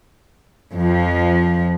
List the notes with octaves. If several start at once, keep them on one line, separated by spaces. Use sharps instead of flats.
F2 F3